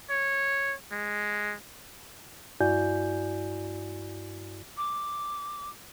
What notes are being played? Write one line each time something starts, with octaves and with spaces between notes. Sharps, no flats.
C#5
G#3
G2 E4 F#4 D5 G#5 G6
D6